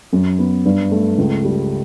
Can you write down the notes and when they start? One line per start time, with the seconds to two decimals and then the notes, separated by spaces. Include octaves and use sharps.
0.13 F#2
0.39 B3
0.65 G2
0.91 A3
1.18 C#2
1.45 G3